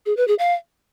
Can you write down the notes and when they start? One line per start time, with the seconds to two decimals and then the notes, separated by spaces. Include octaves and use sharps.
0.06 G#4
0.17 B4
0.28 G#4
0.39 F5